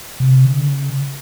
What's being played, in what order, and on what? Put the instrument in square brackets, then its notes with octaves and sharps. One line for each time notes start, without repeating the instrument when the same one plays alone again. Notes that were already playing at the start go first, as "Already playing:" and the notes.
[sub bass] C3
D3
C#3